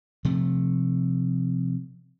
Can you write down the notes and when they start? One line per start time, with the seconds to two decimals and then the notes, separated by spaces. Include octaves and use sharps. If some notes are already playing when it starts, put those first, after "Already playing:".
0.25 C3 F3 A3